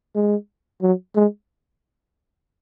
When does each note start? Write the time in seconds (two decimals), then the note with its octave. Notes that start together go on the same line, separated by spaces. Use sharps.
0.15 G#3
0.82 F#3
1.16 G#3